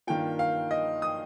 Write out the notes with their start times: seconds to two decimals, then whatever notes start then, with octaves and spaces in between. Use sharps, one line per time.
0.07 G2 D#3 A#3 F4 G5
0.39 F5
0.71 D#5
1.02 D#6